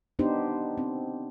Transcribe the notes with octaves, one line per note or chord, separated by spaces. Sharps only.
B3 D4 D#4 G4 C5
C4